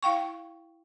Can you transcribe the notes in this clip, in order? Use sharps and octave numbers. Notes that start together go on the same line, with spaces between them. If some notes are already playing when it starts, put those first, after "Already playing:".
E4 F5 G5 C#6